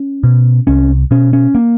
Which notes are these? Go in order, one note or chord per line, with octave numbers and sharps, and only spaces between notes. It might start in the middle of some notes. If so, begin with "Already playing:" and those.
Already playing: C#4
B2
C2 C#4
B2 C#4
C#4
A#3